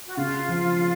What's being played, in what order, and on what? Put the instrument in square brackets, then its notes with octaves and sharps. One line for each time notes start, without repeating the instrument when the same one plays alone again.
[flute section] F#4
[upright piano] C#3 [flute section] F4
[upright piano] F3